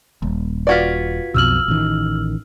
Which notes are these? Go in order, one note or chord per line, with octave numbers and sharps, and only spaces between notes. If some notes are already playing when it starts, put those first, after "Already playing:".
D#1
F4 F#4 B4 D5 G#6 B6
B1 F2 B2 E6 F6 F#7
A1 D#3